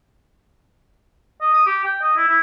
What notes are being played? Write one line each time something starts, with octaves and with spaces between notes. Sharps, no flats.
D#5
D#6
G4
G5
D#5
E4
E4